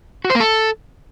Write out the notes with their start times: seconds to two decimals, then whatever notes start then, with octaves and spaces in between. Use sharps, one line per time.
0.25 F#4
0.30 C5
0.35 A#3
0.40 A4